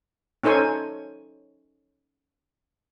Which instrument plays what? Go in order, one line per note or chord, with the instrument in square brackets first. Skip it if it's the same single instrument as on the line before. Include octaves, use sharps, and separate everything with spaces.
[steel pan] C#4 D#4 A4 C5 C#5 G#5